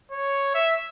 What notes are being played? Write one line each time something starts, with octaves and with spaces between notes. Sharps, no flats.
C#5
E5